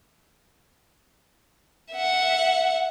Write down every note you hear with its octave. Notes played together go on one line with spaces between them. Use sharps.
E5 F#5